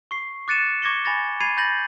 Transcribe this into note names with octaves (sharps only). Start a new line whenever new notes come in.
C#6 C7
D6 F#6 A6 C#7 D#7 E7
C#6 D6 G#6 A#6 C#7 G7
G#5 B5 A6 A#6
B5 G#6 A6 C7 D#7
B5 G6 A6 A#6 F#7